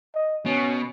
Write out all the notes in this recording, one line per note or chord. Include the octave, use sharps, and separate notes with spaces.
D#5
B2 C#4